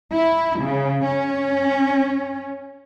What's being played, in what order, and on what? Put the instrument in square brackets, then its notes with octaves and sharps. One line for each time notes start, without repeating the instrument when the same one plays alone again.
[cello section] E4
C#3
C#4